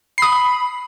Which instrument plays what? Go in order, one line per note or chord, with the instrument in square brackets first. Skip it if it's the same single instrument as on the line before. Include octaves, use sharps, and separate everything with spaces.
[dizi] B5 [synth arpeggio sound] D#6 C7